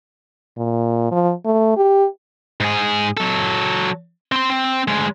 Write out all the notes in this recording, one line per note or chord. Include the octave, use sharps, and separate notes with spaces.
A#2
F3
A3
G4
G#2 G#4
F#3 A4
C4 C6
C4
D2 G#3